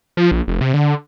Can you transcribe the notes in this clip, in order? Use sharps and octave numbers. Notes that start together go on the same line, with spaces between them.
F3
A#1
F1
C3
D3